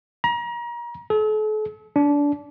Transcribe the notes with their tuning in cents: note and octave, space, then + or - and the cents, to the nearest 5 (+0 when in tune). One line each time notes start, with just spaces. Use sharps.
A#5 +35
A4 -40
D4 -25